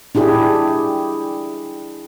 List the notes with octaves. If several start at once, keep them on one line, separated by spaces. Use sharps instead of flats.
D4 E4 G4 G#4